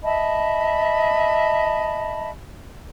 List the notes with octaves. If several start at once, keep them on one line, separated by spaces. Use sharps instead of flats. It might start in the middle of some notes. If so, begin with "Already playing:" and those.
D#5 E5 A5 B5